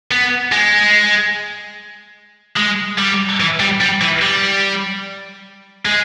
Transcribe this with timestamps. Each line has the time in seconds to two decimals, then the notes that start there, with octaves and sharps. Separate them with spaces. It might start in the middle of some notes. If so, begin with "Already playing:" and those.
0.11 B3
0.52 G#3
2.57 G#3
2.98 G3
3.40 E3
3.60 G3
3.81 G3
4.01 E3
4.22 G3
5.86 G#3